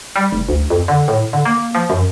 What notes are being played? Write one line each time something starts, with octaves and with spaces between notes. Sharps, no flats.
G3
F1
D2
F2
D3
A2
D3
A#3
F3
F#2